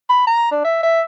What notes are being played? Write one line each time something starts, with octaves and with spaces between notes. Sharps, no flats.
B5
A#5
D4
E5
E5